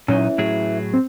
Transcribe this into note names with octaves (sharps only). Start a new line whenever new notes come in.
A#2 E3 F#3 C#4 D#4
A2 F#3 G#4
C4